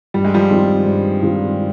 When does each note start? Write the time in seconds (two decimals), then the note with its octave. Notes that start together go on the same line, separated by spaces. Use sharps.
0.14 G2 G3
0.25 G#3
0.34 F3 G3
0.51 D#3 G#3 C4 F4
0.87 G2
1.23 D#3 G#3 C4 F4